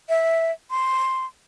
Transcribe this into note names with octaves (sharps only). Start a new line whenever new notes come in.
E5
C6